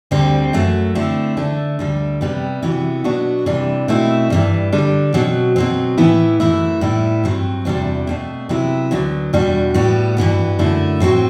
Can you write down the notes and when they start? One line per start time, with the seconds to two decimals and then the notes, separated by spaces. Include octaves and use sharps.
0.11 D2 D3 G3 C4
0.53 F#2 F#3 A3
0.95 D3 A3 C4 E4
1.37 D3 A3 D4
1.79 D2 D3 G3
2.21 C3 G3 B3
2.62 C3 E3 B3 F#4
3.04 B2 F#3 B3 D4 F#4
3.46 C3 E3 G3 D4
3.88 B2 A3 C4 E4
4.30 G2 E3 G3
4.72 D3 G3 D4
5.14 B2 F#3 C4
5.56 B2 F#3 C4
5.98 A2 E3 B3 E4
6.40 F#2 E3 A3 E4
6.81 A2 G3 B3 E4
7.24 G2 F#3 C4
7.65 E2 C3 G3 D4 F#4
8.07 B2 A3 C4
8.49 C3 F#3 B3 E4
8.91 D2 D3 F#3 B3
9.33 E2 B2 G3 D4 F#4
9.74 A2 G3 B3 F#4
10.17 G2 E3 B3 F#4
10.59 F#2 D3 A3 E4
11.00 A2 F#3 C4 F#4